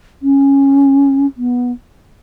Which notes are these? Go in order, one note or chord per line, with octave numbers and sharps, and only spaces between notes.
C#4
B3